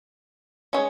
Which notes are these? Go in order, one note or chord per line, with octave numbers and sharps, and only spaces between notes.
G#3 C#4 G#4 C#5